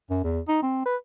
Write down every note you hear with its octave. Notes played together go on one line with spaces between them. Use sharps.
F#2
E2
D#4
C4
B4